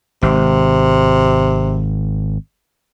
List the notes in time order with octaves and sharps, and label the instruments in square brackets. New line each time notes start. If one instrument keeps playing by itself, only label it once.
[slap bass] G#1 [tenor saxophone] C3